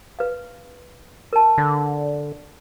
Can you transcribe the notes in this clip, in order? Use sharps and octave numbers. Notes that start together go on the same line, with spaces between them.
B4 F5
A#4 A5
D3